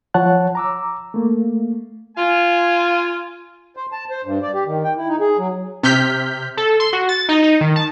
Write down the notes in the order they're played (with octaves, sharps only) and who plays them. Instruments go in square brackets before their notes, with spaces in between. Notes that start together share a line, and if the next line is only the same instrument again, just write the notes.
[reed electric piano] F3 C#5 F#5 A5 F#6
A#5 D6 E6
A3 A#3
[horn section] F4 G#5
[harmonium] C5
A5
C5
G2
D5
G4
D#3
G5
E4
D#4
G#4
F#3
[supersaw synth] C3 F6 G6 B6
[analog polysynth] A4
C6
F#4
A6
D#4
D#4
D#3
A5